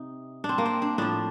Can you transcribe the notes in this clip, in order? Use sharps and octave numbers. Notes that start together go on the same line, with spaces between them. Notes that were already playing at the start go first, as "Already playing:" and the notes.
Already playing: C3 D#4
D4
C4
A#3
C4
D4
A2 F3 D4